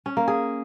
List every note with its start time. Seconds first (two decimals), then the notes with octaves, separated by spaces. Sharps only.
0.06 C#4
0.17 A#3
0.28 G#4